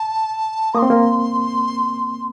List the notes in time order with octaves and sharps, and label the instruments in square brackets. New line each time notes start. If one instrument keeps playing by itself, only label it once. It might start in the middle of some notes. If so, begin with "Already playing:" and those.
Already playing: [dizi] A5
[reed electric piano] A#3 [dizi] D#6
[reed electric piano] C4 [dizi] C6
[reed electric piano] A#3